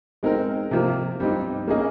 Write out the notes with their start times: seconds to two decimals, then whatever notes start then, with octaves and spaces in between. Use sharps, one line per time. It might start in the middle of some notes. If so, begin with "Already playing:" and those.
0.23 G#3 C4 D#4 A#4
0.71 C3 F3 A#3
1.20 G2 G3 C4 D#4
1.67 A#3 C#4 G#4 D#5